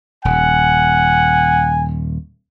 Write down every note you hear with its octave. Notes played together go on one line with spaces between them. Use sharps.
D#1 F#5 G#5